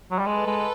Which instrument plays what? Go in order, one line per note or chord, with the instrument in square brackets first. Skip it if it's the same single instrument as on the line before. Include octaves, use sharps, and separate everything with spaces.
[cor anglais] F#3
G3
[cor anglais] G#3 [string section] A4 B4
[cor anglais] G#3